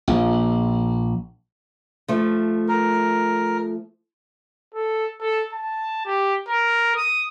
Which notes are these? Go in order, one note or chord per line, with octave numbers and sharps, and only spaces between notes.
A#1
F3 A3
A#4
A4
A4
A5
G4
A#4
D#6